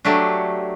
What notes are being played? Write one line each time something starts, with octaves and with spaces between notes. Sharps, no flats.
F#3 A3 D4 G4